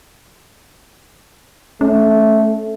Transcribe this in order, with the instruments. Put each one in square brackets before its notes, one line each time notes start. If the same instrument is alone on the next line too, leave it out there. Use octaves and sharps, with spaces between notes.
[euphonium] A3 [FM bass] C#4